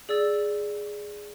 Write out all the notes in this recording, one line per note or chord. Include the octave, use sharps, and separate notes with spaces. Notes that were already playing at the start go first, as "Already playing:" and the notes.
G#4 D5 E6 A6